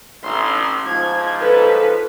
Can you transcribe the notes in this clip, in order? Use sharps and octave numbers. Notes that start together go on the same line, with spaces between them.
A1 C6
G#2 F3 G#6
A4 B4